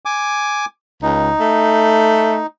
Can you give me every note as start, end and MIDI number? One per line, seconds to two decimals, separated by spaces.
0.05 0.66 80
0.05 0.66 86
1.03 1.31 37
1.03 2.46 63
1.40 2.40 57